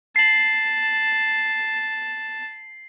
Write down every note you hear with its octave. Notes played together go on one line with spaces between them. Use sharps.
A5 C7 F#7